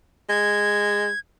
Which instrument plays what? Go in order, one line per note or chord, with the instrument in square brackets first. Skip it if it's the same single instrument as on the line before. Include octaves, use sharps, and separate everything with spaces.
[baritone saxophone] G#3 [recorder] G#6